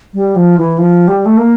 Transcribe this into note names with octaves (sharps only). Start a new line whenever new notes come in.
G3
F3
E3
F3
G3
A3
A#3